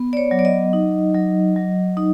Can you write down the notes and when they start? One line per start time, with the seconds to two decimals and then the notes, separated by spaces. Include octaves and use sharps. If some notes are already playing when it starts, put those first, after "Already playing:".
Already playing: B3
0.13 D5
0.17 C#5
0.31 F#3
0.39 D5
0.45 D#5
0.73 D#4
1.14 F#3
1.56 F#3
1.97 D#4